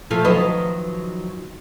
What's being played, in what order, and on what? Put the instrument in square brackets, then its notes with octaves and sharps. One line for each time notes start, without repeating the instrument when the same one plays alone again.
[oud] F3 A3 F4
[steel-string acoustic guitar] D#3 F3 F#3 [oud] B4 D#5